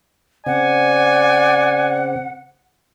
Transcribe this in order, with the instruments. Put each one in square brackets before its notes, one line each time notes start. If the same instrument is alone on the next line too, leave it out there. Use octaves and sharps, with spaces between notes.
[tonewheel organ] C#3 C4 [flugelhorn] D5 [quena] F#5 [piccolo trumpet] G#5